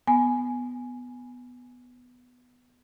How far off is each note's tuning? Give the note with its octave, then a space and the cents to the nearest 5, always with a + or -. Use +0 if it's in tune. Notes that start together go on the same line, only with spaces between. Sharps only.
B3 +5 G#5 +10